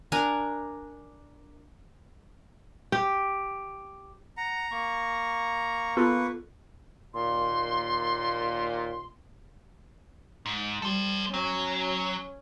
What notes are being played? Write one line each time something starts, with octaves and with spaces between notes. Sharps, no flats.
D4 A#4 G#5 A#5
G4
F#5 A#5
A#3 C#6
B3 F4 A4 B4
D#2 A#2 C6
G#2
G3 A4 C5
F#3 C#4